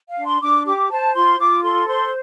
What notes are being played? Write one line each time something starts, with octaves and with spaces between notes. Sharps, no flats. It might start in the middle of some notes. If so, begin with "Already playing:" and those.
F5
D4
C6
D4 D6
G4 D6
C5 A5
F4 C6
F4 D6
A4 C6
C5 C6